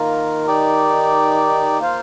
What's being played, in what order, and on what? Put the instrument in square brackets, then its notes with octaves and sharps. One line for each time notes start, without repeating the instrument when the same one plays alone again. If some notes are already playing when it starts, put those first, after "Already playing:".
Already playing: [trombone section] D#3 [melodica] A#3 F4 A#4
[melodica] D#4 G4 D5
A#3 F4 C5 F5